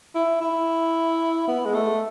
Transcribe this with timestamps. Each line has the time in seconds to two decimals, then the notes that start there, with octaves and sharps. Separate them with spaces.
0.15 E4
0.41 E4
1.47 B3
1.65 G#3
1.74 A3